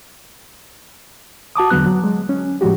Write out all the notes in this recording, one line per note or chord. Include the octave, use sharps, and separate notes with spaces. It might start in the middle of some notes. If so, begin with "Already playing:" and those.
F#4 A5 D6 D#6
E2 D3 F#3 B3 F#6
F#3
F#3 G#3
C#4
A2 F3 G#3 F#4 G4